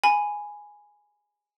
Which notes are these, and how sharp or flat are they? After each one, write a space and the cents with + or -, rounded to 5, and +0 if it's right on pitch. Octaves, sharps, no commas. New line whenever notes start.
G#5 +0 B5 +10